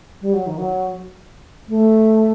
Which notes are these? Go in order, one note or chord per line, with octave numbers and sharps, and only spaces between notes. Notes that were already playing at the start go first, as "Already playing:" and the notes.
G3
F#3
D#3
F#3
A3